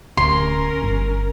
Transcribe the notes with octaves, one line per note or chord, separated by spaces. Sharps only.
D1 D2 C#4 A#4 C6
G1